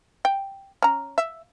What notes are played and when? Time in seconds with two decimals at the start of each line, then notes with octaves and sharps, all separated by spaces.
0.25 G5
0.82 C#4 A#5
1.18 E5